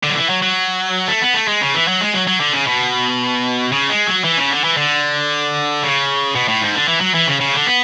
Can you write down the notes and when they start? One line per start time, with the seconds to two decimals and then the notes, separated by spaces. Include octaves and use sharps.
0.03 D3
0.10 F#3
0.16 E3
0.29 F#3
0.42 F#3
1.08 A3
1.22 B3
1.35 A3
1.48 G#3
1.61 C#3
1.74 E3
1.88 F#3
2.01 G#3
2.14 F#3
2.27 F#3
2.40 D3
2.53 C#3
2.67 B2
3.72 C#3
3.90 G#3
4.07 F#3
4.25 E3
4.38 C#3
4.51 D3
4.64 E3
4.77 D3
5.83 C#3
6.35 B2
6.48 A2
6.62 G#2
6.75 D3
6.88 E3
7.01 F#3
7.15 E3
7.28 C#3
7.41 C#3
7.54 D3
7.67 B3